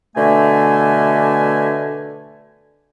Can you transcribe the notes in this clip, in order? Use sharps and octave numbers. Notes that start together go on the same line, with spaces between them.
B2 D3 A3 E5 G#5